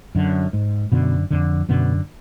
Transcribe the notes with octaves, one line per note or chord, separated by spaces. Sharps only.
F#2 D3
G#2
F#2 B2 D3 B3
F2 D3
F#2 B2 D3 B3